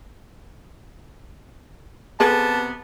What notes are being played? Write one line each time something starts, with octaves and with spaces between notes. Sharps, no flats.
C3 B3 C4 G#4 A4 A5